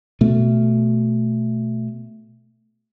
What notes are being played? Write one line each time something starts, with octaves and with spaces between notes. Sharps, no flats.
B2 A3